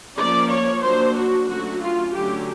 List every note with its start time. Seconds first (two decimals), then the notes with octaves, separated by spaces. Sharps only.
0.17 F3 A#3 C#4 D5
0.49 C#5
0.82 F#3 A#3 D4 C5
1.15 F#4
1.48 D3 F#3 A3 C#4 F#4
1.81 F4
2.13 D3 F#3 A3 C#4 G4